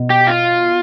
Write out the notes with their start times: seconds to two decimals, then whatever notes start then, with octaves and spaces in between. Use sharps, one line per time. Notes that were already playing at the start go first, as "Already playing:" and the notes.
Already playing: B2
0.10 G4
0.27 F4